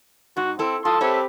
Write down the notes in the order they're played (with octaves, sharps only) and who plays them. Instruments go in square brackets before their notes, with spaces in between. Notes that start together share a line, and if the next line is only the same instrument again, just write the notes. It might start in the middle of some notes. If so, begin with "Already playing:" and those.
[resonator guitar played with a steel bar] G#2 D#4 [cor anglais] F#4
[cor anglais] C4 [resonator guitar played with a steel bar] E4 A4
[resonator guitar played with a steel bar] F4 [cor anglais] A4 [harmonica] A5 C6 D#6
[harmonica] C4 G4 B5 [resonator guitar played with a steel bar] C#5 E5